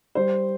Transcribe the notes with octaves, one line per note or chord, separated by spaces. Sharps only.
G3 C5